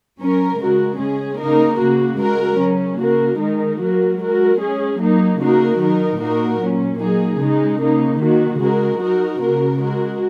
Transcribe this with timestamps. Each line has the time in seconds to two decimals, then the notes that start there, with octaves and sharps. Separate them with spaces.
0.18 F#3 C#4 A#4
0.58 C#3 G#3 F#4 A#4
0.98 G#3 C#4 G#4
1.38 C#3 A#3 D#4 A#4
1.79 C#3 A#3 F#4
2.18 G#3 F#4 A#4
2.59 C#3 F#3 C#4
2.98 C#3 A#3 F#4 A#4
3.38 D#3 G#3 D#4 A#4
3.78 F#3 A#3 F#4 A#4
4.19 G#3 F#4 A#4
4.59 G#3 C#4 G#4
4.99 F#3 A#3 D#4
5.39 C#3 A#3 D#4 F#4 A#4
5.79 D#3 F#3 D#4 A#4
6.19 A#2 A#3 D#4 F#4 A#4
6.59 A#2 F#3 C#4
6.99 F#3 A#3 D#4 G#4
7.39 C#3 G#3 D#4
7.79 C#3 A#3 D#4
8.20 D#3 A#3 F#4
8.60 C#3 G#3 F#4 A#4
9.00 F#3 D#4 F#4 A#4
9.40 C#3 A#3 F#4 A#4
9.80 G#3 F#4 A#4